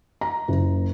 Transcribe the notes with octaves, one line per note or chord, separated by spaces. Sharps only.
A#5
F#1